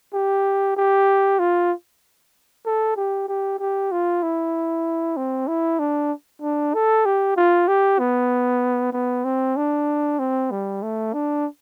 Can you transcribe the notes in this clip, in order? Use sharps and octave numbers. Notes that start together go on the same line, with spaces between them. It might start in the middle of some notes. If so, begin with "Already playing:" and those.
G4
G4
F4
A4
G4
G4
G4
F4
E4
C4
E4
D4
D4
A4
G4
F4
G4
B3
B3
C4
D4
C4
G3
A3
D4